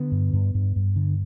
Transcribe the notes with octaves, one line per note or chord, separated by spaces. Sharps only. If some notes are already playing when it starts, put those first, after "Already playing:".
Already playing: D3 B3
G2
G2
G2
G2
D3